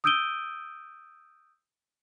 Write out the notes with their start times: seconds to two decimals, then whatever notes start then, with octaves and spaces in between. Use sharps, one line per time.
0.04 D#6 E6 G6 D7 D#7 G7